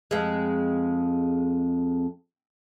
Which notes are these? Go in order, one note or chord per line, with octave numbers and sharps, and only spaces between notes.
F2 G#3